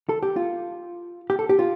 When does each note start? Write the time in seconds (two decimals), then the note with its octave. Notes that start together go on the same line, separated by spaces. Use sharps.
0.09 A4
0.23 G4
0.36 F4
1.30 G4
1.39 A4
1.49 G4
1.59 F4